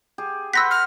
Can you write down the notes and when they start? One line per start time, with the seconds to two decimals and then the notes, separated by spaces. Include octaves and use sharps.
0.18 G4 G#4
0.54 B4 C5 F#5 E6 A#6 B6
0.71 F6